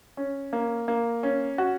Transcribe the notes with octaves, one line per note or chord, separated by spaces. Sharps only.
C#4
A#3
A#3
C#4
F#4